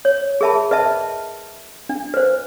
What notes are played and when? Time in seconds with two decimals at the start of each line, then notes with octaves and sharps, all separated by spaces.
0.05 C#5
0.41 G#4 A#4 E5 A5 B5
0.71 B4 D#5 E5 A5
1.89 D4
2.14 B4 C5